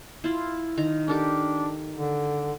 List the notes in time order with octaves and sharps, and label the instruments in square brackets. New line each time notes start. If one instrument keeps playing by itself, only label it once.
[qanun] E4 F4
D#3 A#5
[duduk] D4 [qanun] G4 A4 A#4
[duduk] D3